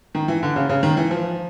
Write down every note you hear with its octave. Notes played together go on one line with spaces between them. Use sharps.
D#3
E3
D3
C#3
C#3
D#3
E3
F3